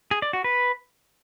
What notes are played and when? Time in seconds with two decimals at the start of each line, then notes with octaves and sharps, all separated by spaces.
0.11 G#4
0.22 D5
0.33 F#4
0.44 B4